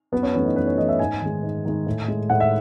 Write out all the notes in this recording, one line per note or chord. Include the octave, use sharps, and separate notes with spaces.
F#2 B3
C#4
E3 A3 C#4
D#4
F#2 B4
C#5
E3 A3 D#5
E5
G#2 G#5
D#3 G#3
G#2
D#3 G#3
A2
G#3
A2 F#5
E5